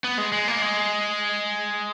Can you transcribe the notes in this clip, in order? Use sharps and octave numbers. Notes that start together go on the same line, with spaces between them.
B3
G#3
G#3
A#3
G#3